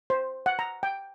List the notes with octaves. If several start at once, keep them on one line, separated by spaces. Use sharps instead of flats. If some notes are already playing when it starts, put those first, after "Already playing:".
C5
F#5
A#5
G5